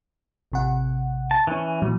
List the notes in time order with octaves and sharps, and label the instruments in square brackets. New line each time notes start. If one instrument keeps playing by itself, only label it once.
[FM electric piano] A1 C3 F#5
[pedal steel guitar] A5
E3 C#4
[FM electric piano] A#2 E3 F#3